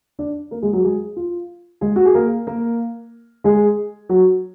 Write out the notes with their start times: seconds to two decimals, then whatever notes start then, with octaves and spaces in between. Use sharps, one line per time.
0.19 D4 D5
0.51 A#3 A#4
0.62 G#3 G#4
0.73 F#3 F#4
0.84 G#3 G#4
1.16 F4
1.81 G#3 G#4
1.96 F#4
2.05 G#4
2.14 A#3 A#4
2.47 A#3 A#4
3.44 G#3 G#4
4.09 F#3 F#4